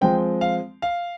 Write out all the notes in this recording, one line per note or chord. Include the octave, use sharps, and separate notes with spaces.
F3 G#3 C4 G5
F5
F5